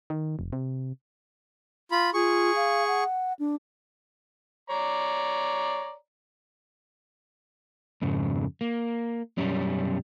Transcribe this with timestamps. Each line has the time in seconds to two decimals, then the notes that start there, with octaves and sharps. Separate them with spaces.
0.10 D#3
0.39 F1
0.53 C3
1.91 F4 B5
2.14 F4 G#4 C#6
2.56 F5
2.87 F#5
3.39 D4
4.70 C#5 D5 A#5
8.02 F2 G#2 C#3
8.61 A#3
9.38 B1 F#2 G3 C#4